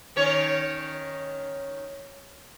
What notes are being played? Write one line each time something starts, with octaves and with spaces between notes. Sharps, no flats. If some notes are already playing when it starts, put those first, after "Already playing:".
D#3 C#4 C#5